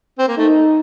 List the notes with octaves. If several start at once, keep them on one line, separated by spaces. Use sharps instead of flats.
C4
A#3
A3 D#4